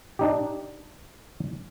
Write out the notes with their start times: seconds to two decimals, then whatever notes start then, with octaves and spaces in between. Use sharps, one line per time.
0.19 D4 D#4 G4